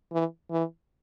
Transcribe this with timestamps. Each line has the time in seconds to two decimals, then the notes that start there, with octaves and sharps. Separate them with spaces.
0.12 E3
0.51 E3